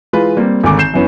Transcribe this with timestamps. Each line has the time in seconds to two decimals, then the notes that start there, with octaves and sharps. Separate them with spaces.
0.13 E3 G#3 F4 B4
0.37 G3 A#3 C4
0.63 G#1 D3 G#5 D6
0.79 G6 C7 E7
0.94 F#2 E3 B3 C#4